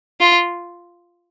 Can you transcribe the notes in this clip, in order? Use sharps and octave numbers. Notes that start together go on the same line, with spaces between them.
F4